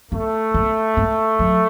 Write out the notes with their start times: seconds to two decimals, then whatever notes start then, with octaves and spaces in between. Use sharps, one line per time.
0.11 A3 B3
0.54 B3
0.97 B3
1.39 F#3